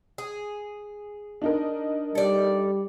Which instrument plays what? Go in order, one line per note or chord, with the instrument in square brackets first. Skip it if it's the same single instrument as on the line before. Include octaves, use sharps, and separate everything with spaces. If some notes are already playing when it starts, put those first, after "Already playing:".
[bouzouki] G#4
[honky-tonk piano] D4 D#4 A#4
[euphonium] G3 [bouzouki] A4 D5